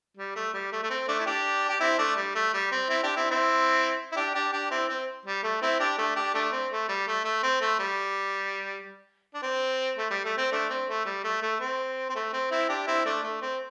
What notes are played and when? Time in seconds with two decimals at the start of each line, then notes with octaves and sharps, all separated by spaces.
0.17 G3
0.36 A3
0.54 G3
0.72 A3
0.83 A3
0.90 C4
1.08 A3 D4
1.19 E4
1.26 D4 G4
1.69 G4
1.80 C4 E4
1.98 A3 D4
2.16 G3
2.35 A3
2.53 G3
2.72 C4
2.89 C4 E4
3.03 D4 G4
3.16 C4 E4
3.30 C4 E4
4.12 E4
4.16 D4 G4
4.34 D4 G4
4.53 D4 G4
4.71 C4 E4
4.89 C4
5.26 G3
5.43 A3
5.62 C4 E4
5.80 D4 G4
5.98 A3 D4
6.16 D4 G4
6.34 A3 D4
6.52 C4
6.71 A3
6.89 G3
7.07 A3
7.24 A3
7.43 C4
7.61 A3
7.79 G3
9.34 D4
9.42 C4
9.97 A3
10.10 G3
10.24 A3
10.38 C4
10.52 A3 D4
10.70 C4
10.88 A3
11.05 G3
11.24 A3
11.42 A3
11.60 C4
12.09 C4
12.15 A3
12.33 C4
12.51 C4 E4
12.69 D4 G4
12.87 C4 E4
13.05 A3 D4
13.23 A3
13.42 C4